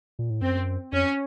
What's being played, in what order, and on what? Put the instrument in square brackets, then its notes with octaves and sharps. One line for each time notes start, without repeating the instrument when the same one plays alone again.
[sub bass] A#2
A2
[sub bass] F#2 [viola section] C4
[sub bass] F2 [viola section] C#4